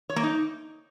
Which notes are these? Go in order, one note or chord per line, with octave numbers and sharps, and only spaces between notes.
C#5
A#3
D#4